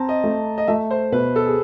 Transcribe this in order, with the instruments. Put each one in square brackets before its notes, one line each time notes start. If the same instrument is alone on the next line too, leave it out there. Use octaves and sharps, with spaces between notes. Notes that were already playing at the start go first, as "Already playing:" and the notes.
Already playing: [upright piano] C4 [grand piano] A5 A#5
[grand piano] D#5
[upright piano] A3
[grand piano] D#5
[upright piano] A3 [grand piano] E5
[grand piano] C5
[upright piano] B2 [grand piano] B4
[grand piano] A4
G#4